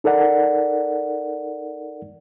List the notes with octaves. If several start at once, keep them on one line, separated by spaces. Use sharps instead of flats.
D#4 A4 A#4 D5 F#5